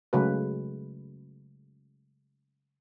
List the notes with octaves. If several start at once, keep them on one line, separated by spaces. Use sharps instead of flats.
C#3 F#3 G#3 A3 F#4 B4